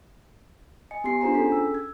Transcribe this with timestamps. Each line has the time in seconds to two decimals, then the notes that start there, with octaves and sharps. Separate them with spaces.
0.91 D#5 G#5 C#7
1.04 B3 G4 G#5 C6 C7
1.21 D4 F4 G#4 C5 G#5 A#5
1.35 C#4 G#4 A4 B6
1.52 E6
1.75 G#6